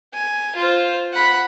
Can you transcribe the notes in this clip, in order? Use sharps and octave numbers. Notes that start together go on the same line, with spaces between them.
G#5
F4 C5
F#5 B5